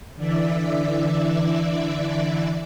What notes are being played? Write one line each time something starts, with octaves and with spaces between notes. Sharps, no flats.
D3 E3 D5 E5